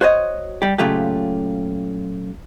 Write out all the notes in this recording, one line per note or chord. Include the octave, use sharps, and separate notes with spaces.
F#4 C5 C#5 D#5
G3 G4
A#2 C#3 F#3 A3 F4 G4